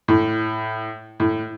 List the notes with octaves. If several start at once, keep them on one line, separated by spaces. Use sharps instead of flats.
A2
A2